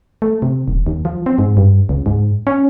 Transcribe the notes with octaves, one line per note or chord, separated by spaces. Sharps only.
A3
C3
D#1
D#2
F3
C4
G#2
G2
C#2
G#2
C#4